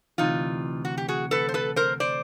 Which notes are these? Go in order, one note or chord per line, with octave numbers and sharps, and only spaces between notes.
D2 C3 E3 D#4 F4
F#4
G4
F#4 G#4
A4 B4
C5
A4 B4
A#4 C5
C5 D5